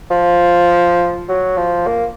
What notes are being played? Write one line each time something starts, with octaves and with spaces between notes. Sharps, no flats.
F3
F#3
F3
A#3